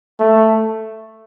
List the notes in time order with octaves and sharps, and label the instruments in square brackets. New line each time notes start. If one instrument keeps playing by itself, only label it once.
[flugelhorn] A3